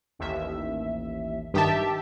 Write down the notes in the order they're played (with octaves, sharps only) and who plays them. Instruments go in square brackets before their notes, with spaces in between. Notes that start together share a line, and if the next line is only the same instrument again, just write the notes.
[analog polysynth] A1 D#2 E5
[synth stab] G2 D#3 A5 [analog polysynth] G4 E5